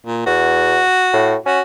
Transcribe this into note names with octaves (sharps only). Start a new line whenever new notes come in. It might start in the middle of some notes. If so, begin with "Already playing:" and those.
A#2
E2 F#4
A2
C#4 F#4